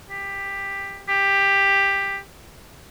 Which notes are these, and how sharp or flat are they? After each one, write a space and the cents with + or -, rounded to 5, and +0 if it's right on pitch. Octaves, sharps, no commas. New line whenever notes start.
G4 +15
G4 +10